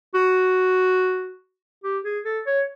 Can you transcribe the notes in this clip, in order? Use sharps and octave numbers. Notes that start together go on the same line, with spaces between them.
F#4
G4
G#4
A4
C#5